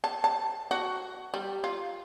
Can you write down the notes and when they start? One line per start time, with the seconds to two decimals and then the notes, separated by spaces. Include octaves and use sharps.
0.04 A5
0.24 A5
0.71 F#4
1.34 G3
1.64 F4